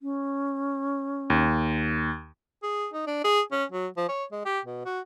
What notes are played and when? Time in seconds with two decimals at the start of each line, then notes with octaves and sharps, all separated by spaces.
0.01 C#4
1.30 D#2
2.63 G#4
2.93 D#4
3.07 D4
3.25 G#4
3.52 C#4
3.72 F#3
3.97 F3
4.09 C#5
4.32 G#3
4.46 G4
4.65 B2
4.86 F#4